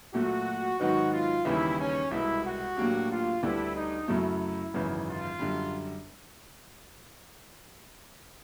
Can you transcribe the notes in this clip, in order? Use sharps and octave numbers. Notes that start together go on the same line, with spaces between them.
A#2 F#3 A3 F#4
G#2 D#3 F#3 B3 D#4 F#4
F4
D#2 C#3 E3 G3 E4
C#4
C2 B2 G#3 E4
F#4
A2 F#3 A#3 D4 G4
F4
D2 D3 G3 B3 D4 E4
D#4
F#2 C#3 F#3 A3 E4
G#1 F#2 C#3 E3
F4
F#2 D3 G3